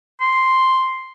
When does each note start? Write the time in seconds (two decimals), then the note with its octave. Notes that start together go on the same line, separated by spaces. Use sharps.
0.21 C6